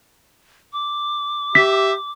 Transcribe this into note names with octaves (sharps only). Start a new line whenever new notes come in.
D6
G4 E5 B6